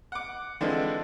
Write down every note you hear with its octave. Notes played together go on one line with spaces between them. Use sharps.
F#5 D6
D3 E3 F3 G#3 C4 D4